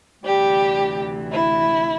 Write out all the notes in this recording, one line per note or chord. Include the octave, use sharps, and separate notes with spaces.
D2 C3 E3 G3 G4
E4